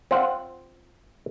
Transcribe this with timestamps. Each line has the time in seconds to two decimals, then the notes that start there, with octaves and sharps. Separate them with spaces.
0.11 C4 F4 F#5